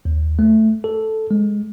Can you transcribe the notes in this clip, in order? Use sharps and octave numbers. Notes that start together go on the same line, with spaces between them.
D#2
A3
A4
G#3